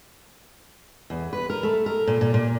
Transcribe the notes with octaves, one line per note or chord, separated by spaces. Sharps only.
E2
B4
A#4
A3
A#4
A#2
A#2
A#2